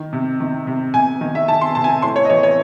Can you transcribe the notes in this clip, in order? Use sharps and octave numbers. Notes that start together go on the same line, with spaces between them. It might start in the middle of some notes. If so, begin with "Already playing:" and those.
Already playing: D#3
C3
D#3
C3
C3 G#5
D#3
E5
D#3 A5
C6
C3 A5
G#5
A5
A2 C6
C#5
D#5
E3 C#5
C#5